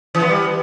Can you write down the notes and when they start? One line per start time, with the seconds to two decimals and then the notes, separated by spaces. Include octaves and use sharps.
0.15 E3
0.22 B3
0.29 G3